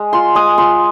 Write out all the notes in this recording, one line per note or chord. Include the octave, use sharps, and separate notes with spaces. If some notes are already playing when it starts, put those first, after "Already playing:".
Already playing: G#3
F4 C6
G#3 D#6
F4 C6